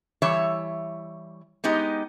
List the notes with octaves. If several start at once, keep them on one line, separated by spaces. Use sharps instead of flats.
E3 G3 C#5 E5
G#3 B3 D#4 G4